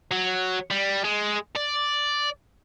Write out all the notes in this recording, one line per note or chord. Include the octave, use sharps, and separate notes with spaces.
F#3
G3
G#3
D5